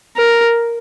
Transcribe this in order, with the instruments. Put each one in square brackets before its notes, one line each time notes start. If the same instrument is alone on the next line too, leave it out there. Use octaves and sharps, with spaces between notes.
[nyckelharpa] A#4